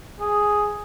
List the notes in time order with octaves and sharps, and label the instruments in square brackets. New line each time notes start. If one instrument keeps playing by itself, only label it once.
[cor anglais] G#4